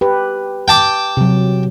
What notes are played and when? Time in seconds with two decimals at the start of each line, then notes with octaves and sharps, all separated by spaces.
0.01 G4 B4
0.68 G5 A5 D6
1.17 C3 F#3